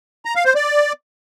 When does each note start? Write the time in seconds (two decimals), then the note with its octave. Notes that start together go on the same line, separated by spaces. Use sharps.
0.25 A#5
0.35 F5
0.45 C5
0.55 D5